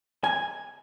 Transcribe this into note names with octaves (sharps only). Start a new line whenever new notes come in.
G#5